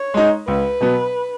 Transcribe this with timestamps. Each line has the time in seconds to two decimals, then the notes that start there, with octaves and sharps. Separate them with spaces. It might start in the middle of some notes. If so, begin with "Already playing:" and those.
Already playing: C#5
0.14 G#3 D#4
0.47 C#2 B4
0.81 B2 F#3 B3